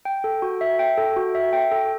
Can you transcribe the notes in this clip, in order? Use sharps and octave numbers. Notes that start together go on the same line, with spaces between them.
G5
A4
F#4
E5
G5
A4
F#4
E5
G5
A4